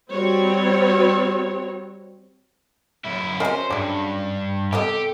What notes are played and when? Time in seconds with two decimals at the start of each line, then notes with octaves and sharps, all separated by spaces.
0.11 G3 C4 F#4 C#5
3.04 F#2 E4
3.40 F#3 C#4 A#4 C5 D#5 G#5
3.70 G2 G#3 D5
4.73 C3 G3 B3 G4 A4 D#5